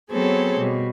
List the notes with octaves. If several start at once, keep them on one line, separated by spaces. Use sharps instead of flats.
F#3 B3 C4 G#4 A4 C#5
B2 G3